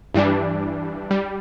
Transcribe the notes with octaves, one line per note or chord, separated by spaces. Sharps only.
G2 E3 G3 D4
G3